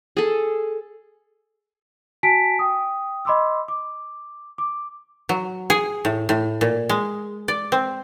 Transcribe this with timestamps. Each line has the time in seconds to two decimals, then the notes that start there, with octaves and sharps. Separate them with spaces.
0.17 G#4 A4
2.23 F#4 G#5 A5 B6 D7
2.59 G5 D#6
3.25 D#5 B5 C6 D6 E6
3.68 D6
4.58 D6
5.29 F#3
5.70 G#4
6.05 A2
6.29 A2
6.61 A#2
6.89 G#3
7.48 D5
7.72 C4